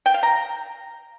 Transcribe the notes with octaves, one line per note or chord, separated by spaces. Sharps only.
G5
F5
A#5